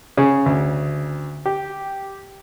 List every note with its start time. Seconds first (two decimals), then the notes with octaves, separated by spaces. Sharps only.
0.17 C#3
0.46 D2
1.46 G4